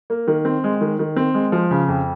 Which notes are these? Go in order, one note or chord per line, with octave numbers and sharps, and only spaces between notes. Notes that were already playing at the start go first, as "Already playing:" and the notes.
A#3
D#3
C4
G#3
D#3
D#3
C4
G#3
F3
C#3
F2